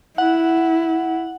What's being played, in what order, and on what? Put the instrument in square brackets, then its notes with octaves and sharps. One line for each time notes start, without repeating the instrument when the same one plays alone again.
[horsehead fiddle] E4 [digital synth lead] F#5